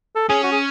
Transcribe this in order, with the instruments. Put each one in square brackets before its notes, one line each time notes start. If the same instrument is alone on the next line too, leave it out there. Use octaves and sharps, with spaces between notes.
[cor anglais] A4
[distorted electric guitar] C#4 [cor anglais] G#4
[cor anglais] F#4
G#4